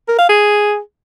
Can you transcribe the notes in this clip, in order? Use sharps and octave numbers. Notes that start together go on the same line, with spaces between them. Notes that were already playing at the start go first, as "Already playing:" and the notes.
A#4
F5
G#4